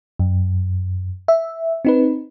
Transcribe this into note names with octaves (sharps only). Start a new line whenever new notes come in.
F#2
E5
C4 D#4 B4